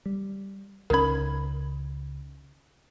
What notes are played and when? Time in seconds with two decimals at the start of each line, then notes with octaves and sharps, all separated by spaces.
0.06 G3
0.90 C#2 D#3 F3 C#4 A#4 B5 G#6